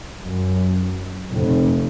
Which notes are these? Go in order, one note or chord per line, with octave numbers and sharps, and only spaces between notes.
F#2
F1